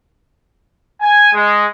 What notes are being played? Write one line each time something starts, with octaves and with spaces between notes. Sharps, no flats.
G#5
G#3